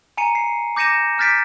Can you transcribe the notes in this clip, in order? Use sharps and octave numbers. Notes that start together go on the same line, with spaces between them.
G#5 A#5 C#7 D#7
C7
D6 G6 A#6 C#7 D#7 E7
D6 F6 G6 A6 B6 D7